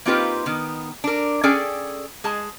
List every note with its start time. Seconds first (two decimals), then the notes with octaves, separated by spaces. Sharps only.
0.06 A#3 C4 D#4 F4 G4 B4
0.46 D#3 B3
1.04 D4 A#4
1.43 C#4 G#4 A4 D5 G5 G#5
2.24 G#3 G#4 A5